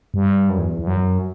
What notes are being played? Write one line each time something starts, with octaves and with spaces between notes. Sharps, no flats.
G2
F#2
E2
E2
F#2